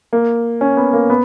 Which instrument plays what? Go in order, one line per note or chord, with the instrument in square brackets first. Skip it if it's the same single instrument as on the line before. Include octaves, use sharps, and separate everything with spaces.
[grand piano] A#3
C#4
B3
A#3
B3